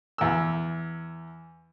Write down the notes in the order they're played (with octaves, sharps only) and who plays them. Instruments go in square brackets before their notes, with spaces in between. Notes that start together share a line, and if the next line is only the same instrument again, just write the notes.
[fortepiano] E2 E6